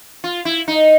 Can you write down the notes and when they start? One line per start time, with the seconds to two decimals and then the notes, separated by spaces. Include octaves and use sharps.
0.24 F4
0.45 E4
0.68 D#4